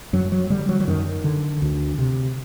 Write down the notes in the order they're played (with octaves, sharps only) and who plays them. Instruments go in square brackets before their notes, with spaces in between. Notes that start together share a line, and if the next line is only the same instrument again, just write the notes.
[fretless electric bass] F#2 F#3
F#3
D3 G3
F#3
F#3
F#2 D#3
D3
D2
C3